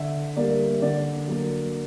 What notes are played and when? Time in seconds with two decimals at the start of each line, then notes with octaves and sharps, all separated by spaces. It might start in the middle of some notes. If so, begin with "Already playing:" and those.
Already playing: D3 E5
0.36 G3 A#3 D5
0.82 D3 D5
1.28 F#3 A#3